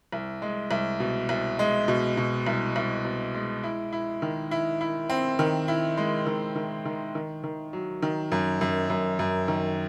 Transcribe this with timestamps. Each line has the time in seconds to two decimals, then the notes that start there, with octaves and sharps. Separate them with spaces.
0.12 C2
0.42 G#3
0.71 C2
1.00 B2
1.29 C2
1.59 G#3
1.88 B2
2.17 B2
2.47 C2
2.76 C2
3.05 B2
3.34 G#3
3.63 E4
3.93 E4
4.22 D#3
4.51 E4
4.81 E4
5.10 C4
5.39 D#3
5.68 E4
5.97 G#3
6.27 D#3
6.56 D#3
6.85 D#3
7.15 D#3
7.44 D#3
7.73 F#3
8.03 D#3
8.32 F#2
8.61 F#2
8.90 F#2
9.19 F#2
9.48 D#3